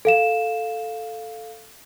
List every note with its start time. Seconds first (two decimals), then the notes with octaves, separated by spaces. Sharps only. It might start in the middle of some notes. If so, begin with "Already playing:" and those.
0.05 A4 F5 E7